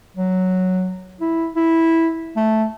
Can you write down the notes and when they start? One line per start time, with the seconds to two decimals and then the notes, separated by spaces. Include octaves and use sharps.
0.17 F#3
1.21 E4
1.56 E4
2.36 A3